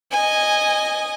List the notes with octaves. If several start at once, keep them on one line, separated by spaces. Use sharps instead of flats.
D#5 G#5